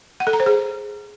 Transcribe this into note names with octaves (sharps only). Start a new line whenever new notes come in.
F#5
A4
A#5
C5
G#4